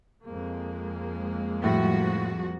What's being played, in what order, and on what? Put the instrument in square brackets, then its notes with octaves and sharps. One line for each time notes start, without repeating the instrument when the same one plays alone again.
[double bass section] F2 G#3 A#3
[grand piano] A2 [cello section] F3 G3 F#4